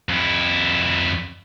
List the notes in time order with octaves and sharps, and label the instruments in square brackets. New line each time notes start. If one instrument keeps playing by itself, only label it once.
[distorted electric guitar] F2 E4